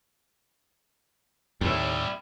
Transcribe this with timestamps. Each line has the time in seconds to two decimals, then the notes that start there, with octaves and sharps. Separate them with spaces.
1.61 D#2 A2 G3 E4